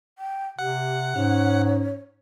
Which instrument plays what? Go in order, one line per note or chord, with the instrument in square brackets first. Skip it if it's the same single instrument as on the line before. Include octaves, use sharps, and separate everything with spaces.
[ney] G5
[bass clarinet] C3 [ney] G4 [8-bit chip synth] F#5
[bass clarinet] G#2 [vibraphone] C#4 [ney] C#5